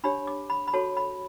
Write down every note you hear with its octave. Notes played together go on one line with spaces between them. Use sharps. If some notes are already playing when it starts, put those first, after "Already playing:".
D4 G4 C#5 B5
D6
B5
B5
F#4 A4 C#5 A5
B5